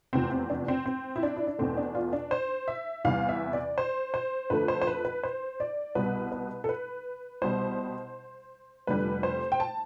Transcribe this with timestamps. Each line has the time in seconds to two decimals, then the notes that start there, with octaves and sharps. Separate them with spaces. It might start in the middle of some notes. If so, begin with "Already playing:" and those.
0.13 F1 E2 C3 F3 C4
0.32 C4
0.50 D4
0.68 C4
0.86 C4
1.16 E4
1.23 D4
1.36 E4
1.47 D4
1.59 E2 B2 A3 C4
1.77 D4
1.95 F4
2.13 D4
2.31 C5
2.68 E5
3.04 E2 C3 E3 G3 F5
3.29 E5
3.53 D5
3.78 C5
4.14 C5
4.50 F2 D3 A3 B4
4.68 C5
4.81 C5
4.87 B4
5.05 B4
5.23 C5
5.60 D5
5.95 C2 B2 G3 B4
6.32 B4
6.64 A4
6.69 B4
7.42 C2 B2 G3 C5
8.87 F1 F2 D3 G3 B4
9.23 C5
9.52 G5
9.60 A5